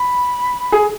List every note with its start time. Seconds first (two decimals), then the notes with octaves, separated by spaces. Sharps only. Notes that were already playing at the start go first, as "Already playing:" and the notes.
Already playing: B5
0.72 G#4